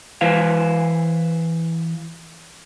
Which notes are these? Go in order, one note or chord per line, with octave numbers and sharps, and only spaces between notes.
E3 E4 B4 C5 F5